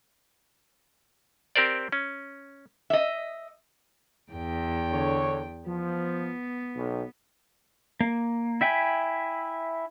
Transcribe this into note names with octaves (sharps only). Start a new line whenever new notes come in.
C4 G4 A#4 C5 D5
C#4
D#5 E5
E2 G5
D3 C#5
F3 B3
B1
A#3
E4 E5 G5 G#5 B5